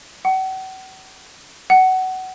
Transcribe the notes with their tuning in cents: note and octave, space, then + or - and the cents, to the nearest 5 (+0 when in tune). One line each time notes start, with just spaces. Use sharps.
F#5 +40
F#5 +20